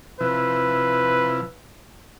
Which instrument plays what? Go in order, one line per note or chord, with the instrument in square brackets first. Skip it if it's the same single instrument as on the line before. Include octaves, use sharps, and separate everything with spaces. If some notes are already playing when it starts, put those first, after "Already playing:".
[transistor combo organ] C3 F3 E4 [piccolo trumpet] B4